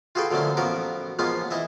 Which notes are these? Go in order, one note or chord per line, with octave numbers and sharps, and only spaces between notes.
F4 F#4 G#4 A4 B4 G5
D3 F3 F#3 A3 A#3 C#4
A1 F3 B3 F#4 A#4 D6
F3 G#3 A#3 B3 C#4 F4
E3 E4 D#5 E5